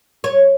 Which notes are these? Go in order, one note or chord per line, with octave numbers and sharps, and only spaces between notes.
C#5